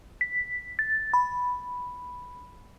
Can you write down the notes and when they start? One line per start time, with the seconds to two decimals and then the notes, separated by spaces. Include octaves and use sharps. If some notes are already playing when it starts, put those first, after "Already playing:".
0.21 B6
0.79 A6
1.14 B5